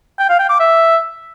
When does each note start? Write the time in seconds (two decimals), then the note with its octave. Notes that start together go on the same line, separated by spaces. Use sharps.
0.19 G5
0.29 F5
0.39 G5
0.49 D6
0.59 E5